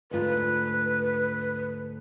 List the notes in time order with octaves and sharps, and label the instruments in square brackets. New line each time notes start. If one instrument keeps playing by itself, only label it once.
[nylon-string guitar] D2 G#2 F4 [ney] B4